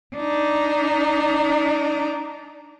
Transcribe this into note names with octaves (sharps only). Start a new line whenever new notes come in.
D4 D#4